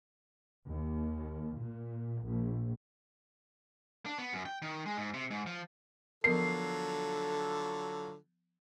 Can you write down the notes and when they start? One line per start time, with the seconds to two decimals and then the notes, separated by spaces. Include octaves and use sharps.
0.68 D#2
1.60 A#2
2.24 A#1
4.06 D4
4.18 B3
4.33 F#2
4.46 G5
4.62 D#3
4.86 G#3
4.97 G#2
5.14 C3
5.31 G#2
5.46 F3
6.24 D3 F3 F#3 B3 F4 A4 A#4 C7